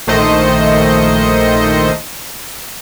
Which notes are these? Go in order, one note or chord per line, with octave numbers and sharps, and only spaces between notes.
A#1 D#3 A3 C5 D#5 C#7